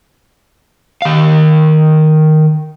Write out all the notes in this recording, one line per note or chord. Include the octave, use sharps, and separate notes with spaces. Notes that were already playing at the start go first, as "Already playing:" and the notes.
D#3 F5